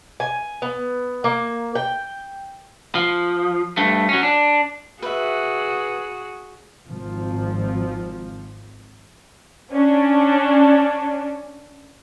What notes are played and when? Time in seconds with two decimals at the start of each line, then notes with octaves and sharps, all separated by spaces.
0.20 G#5
0.62 B3
1.24 A#3
1.75 G5
2.95 F3
3.77 G2 A3
4.09 F#3 C#4
4.23 D4
5.02 F#4 G#4 B4 E5
6.87 G#1 F3
9.73 C#4 D4